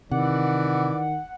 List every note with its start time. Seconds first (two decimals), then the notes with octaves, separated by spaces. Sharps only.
0.11 C3 D#3 E3 D5 F#5